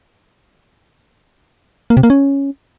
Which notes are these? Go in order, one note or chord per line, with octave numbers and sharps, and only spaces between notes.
A#3
C3
A#3
C#4